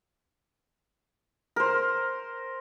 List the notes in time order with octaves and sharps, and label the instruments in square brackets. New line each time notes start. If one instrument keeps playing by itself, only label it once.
[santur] A#4 C5